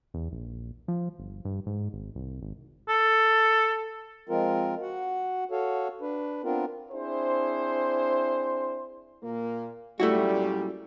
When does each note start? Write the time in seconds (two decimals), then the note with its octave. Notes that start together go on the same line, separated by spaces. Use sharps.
0.14 E2
0.32 A#1
0.88 F3
1.19 G1
1.45 G2
1.67 G#2
1.93 G#1
2.15 C2
2.42 G#1
2.88 A4
4.29 F3 G#3 C4 F4 A#4
4.82 F#4 F#5
5.51 F#4 A4 C#5 F5
6.01 D4 B4
6.44 B3 C4 D4 F4 A#4
6.92 C4 D4 E4 G#4 C5
9.23 A#2 A#3
10.00 F#2 A#2 G3 A3 E4 F#4